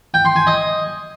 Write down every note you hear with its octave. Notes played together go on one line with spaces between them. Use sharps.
G5
C6
G#5
D#5